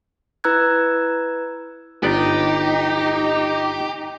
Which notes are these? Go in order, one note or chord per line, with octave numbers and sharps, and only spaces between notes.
E4 B4 A#5 E6 F#6 G#6
G1 B3 D#4 G4 D5